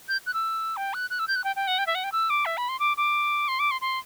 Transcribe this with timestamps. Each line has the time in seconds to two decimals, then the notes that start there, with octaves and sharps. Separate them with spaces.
0.08 G6
0.26 F#6
0.34 E6
0.77 G5
0.94 F#6
1.10 F#6
1.19 E6
1.28 G6
1.36 F#6
1.44 G5
1.56 G5
1.67 F#5
1.78 G5
1.87 E5
1.95 F#5
2.04 G5
2.12 E6
2.30 D6
2.46 E5
2.57 B5
2.69 C6
2.79 D6
2.97 D6
3.48 C6
3.59 D6
3.71 C6
3.81 C6